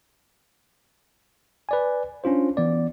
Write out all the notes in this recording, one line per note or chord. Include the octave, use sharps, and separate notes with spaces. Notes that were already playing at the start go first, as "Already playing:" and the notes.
B4 D5 G#5
C#4 D4 F4 C5
E3 B3 D5